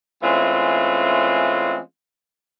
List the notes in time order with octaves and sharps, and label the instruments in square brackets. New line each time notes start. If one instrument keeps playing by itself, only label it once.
[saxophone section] E3 G#3 A3 C4 C#4 F4